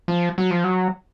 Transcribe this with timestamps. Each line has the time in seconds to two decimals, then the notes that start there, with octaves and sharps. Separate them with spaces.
0.08 F3
0.38 F#3
0.51 F3
0.64 F#3